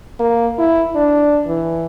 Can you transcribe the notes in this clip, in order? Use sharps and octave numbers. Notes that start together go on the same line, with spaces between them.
A#3
E4
D4
E3